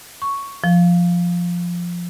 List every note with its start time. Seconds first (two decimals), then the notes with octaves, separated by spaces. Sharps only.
0.22 C#6
0.64 F3